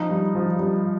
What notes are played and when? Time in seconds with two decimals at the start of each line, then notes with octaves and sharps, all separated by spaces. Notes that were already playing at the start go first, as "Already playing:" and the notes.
Already playing: F3 D#4
0.09 G2
0.35 F3
0.59 G2